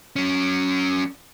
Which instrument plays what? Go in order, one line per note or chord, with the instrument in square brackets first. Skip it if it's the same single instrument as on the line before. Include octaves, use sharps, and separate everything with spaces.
[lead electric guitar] F#3 C#4